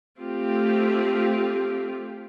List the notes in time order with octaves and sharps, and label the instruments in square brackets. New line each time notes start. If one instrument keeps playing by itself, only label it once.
[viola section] A3 C4 F4 G4